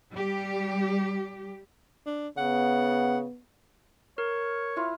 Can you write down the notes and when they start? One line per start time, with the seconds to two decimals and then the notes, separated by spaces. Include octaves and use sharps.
0.11 G3 G4
2.06 D4
2.37 C#3 B3 F#5
4.18 A#4 C#5
4.76 E4 F4 F5